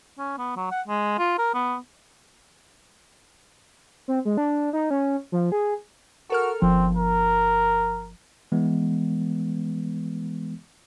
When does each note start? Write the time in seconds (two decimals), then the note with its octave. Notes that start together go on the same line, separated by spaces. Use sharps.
0.19 C#4
0.38 B3
0.56 F#3
0.71 F#5
0.88 G#3
1.18 F4
1.39 A#4
1.54 B3
4.08 C4
4.25 G#3
4.37 D4
4.73 D#4
4.90 C#4
5.32 F3
5.52 G#4
6.30 F#4 A4 A#4 F6
6.62 G1 F3 C4
6.97 A#4
8.52 E3 G#3 B3